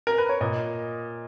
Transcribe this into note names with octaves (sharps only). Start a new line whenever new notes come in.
A#4
B4
C#5
A#2 D#5